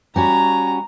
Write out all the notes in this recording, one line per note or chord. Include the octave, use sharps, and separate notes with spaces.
G3 C#4 F#4 A#5